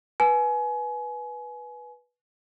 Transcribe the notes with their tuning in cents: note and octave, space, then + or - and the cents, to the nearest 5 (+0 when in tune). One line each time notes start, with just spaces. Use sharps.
B4 -15 G#5 +30